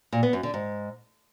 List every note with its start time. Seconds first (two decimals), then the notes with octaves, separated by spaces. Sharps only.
0.12 A#2
0.23 B3
0.33 F#2
0.43 D3
0.54 G#2